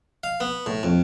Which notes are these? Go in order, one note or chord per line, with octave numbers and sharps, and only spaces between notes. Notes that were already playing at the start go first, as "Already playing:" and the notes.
F5
B3
A2
F2